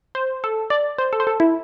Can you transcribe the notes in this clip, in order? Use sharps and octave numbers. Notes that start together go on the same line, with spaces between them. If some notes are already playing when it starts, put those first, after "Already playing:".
C5
A4
D5
C5
A4
C5
A4
E4